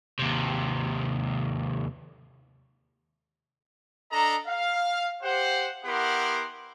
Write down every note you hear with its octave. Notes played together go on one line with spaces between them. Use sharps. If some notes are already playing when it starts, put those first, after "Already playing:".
D#2 C3
D4 A4 D#5 A#5
F5
G4 C5 F#5
B3 E4 G4 A#4 F#5 C6